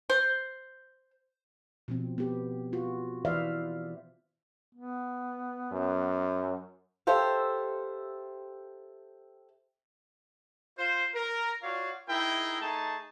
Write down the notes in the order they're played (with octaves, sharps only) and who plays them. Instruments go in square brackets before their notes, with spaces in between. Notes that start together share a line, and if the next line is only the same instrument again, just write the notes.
[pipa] C5
[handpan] B2 F3 C4
B3 G4
F4 F#4
E3 B4 C5 D5 E5 F5
[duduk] B3
[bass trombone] F#2
[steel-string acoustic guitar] G4 A4 C5 E5 F5
[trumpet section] F4 C5
A#4
F4 F#4 C#5 D5 F5
D#4 E4 G#4 A#4 G5
A3 D#4 G#4 A5